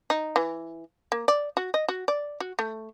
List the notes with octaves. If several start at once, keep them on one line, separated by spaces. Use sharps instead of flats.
D#4
E3
A#3
D5
F#4
D#5
F#4
D5
F#4
A3